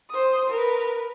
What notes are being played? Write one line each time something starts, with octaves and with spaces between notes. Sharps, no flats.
C5 D#6
A#4 B4